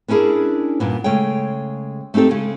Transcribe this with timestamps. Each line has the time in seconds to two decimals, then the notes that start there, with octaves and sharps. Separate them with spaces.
0.08 B3 C#4 D4 E4 G#4 A#4
0.80 G2 A#2 B3
1.04 C#3 G#3 A3 C#5 G5
2.14 A3 C4 D#4 G4 A4
2.29 C#3 G#3